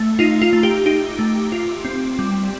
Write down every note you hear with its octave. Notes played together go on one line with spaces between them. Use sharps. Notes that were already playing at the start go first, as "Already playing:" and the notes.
Already playing: A3
D#4 F4
F4
A3
G4
D#4 G4
A3
F4
C4
G3